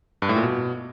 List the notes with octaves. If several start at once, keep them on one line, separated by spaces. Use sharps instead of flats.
G2
A2
A#2
B2